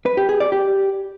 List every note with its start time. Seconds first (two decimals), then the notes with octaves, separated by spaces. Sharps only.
0.06 B4
0.17 G4
0.29 G#4
0.40 D5
0.52 G4